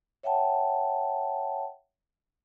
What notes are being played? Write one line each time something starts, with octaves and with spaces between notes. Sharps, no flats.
C#5 E5 F#5 G5 A5